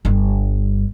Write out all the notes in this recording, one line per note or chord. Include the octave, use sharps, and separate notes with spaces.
G1 G2